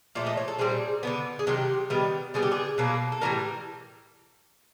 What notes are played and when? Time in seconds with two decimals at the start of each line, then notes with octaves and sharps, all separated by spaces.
0.15 A#2 F3 A3 D5
0.26 D#5
0.37 C#5
0.48 A4
0.59 A#2 G3 C4 G#4
1.03 D3 G3 B3
1.39 G#4
1.47 C3 D#3 F#3 G4
1.90 D#3 G3 B3
2.34 D3 G3 B3 G#4
2.43 G4
2.52 G#4
2.78 B2 F#3 A#3
3.12 A4
3.21 A2 E3 G3 A#4